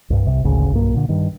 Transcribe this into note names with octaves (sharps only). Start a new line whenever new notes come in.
C2 G2
C2 C3
G#1 D2 C#3 C#4
B1 G2 A#3
A#2 D3
G2 D#3